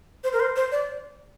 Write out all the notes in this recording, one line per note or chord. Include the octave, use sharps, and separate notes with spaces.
C5
A#4
C5
C5
D5